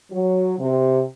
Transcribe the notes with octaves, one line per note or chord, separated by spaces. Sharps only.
F#3
C3